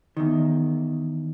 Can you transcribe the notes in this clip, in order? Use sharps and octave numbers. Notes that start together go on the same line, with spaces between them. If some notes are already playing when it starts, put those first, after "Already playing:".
E2 D#3